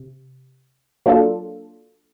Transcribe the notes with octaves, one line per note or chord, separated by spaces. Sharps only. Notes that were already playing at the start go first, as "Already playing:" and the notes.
Already playing: C3
F#3 A#3 D4 F4 A4